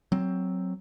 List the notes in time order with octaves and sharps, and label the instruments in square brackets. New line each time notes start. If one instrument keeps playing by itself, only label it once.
[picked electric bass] F#3 C4